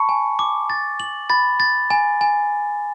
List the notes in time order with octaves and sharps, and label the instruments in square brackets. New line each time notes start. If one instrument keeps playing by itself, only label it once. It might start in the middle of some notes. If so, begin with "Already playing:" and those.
Already playing: [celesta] A5 B5 C#6 [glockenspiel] C#7
[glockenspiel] G#5
D6
A6
F#7
[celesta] B5 [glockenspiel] A6
[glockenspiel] A6
G#5
G#5